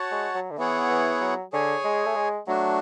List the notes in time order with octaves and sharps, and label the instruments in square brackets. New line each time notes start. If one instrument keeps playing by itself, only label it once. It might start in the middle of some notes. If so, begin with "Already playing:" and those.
Already playing: [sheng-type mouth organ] F#4 C#5 F#5 A5
[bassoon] G#3
F#3
D3
[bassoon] E3 [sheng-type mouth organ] B3 E4 G#4 C#5 F#5
[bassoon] E3
F#3
[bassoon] D3 [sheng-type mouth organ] G#4 C#5 G#5
[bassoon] G#3
A3
G#3
[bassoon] F#3 [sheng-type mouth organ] A3 D4 F#4